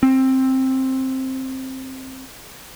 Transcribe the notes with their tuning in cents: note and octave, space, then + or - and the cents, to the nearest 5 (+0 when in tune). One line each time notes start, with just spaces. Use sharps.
C4 +10